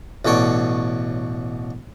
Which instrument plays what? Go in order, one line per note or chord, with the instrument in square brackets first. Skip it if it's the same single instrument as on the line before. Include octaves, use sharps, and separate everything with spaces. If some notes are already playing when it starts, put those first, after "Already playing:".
[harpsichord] A1 B2 A4 C#5 D5